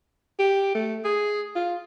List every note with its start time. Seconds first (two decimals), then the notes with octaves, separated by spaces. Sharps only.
0.39 G4
0.75 A3
1.04 G#4
1.55 F4